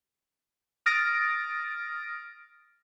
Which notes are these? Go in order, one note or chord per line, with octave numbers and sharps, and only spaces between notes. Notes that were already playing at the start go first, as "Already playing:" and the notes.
D#6 F6 A6 A#6 D7